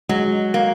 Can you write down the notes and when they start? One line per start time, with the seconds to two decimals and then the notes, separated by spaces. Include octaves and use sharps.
0.09 F#3 G#3
0.54 A#3